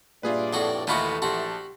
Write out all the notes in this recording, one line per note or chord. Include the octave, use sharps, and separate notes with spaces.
G2 A#2 F4 G#4 B4 D5 E5
F2 A2 F#4
D#2 E3 A3 D#4 F4 F#4 B5 C#6
A#1 F#4 G4 A5 C6